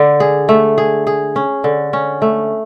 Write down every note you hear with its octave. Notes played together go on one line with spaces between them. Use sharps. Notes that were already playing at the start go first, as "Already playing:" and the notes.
Already playing: D3 D4
G#4
A3
G#4
G#4
C#4
D3
C#4
A3